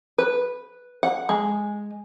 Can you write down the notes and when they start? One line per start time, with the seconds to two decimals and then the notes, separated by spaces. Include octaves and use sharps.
0.18 B4
1.03 F#5
1.29 G#3